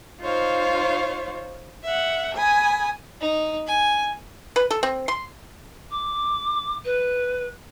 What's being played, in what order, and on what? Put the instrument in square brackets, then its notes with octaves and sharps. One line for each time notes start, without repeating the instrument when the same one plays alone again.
[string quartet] D#4 F4 C5 C#5 F5
E5 F#5
G#5 B5 D#6
[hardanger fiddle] D#4
G#5
[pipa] B4
A4
C4
C6
[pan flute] D6
B4